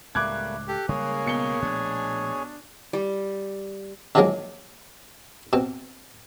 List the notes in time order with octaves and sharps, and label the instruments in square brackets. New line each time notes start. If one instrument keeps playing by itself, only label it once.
[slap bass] C#2 A2 [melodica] G3 A3 A#3 [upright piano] D6 F#6 G#6
[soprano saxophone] G4 [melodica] A4
[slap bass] C#3 G3 G#3 [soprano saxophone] A#3 [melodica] G#4 C#5 G#5
[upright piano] B1 C#7 G7
[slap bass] A#2 F3 A3 [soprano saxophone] D4
[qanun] G3
[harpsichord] D3 D#3 F3 F#3 G#3 A#3
B2 C4